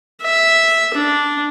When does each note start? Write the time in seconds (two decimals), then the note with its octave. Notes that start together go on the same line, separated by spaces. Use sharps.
0.22 E5
0.94 D4